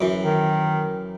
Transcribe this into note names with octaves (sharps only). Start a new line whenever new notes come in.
F#2 E3
D#3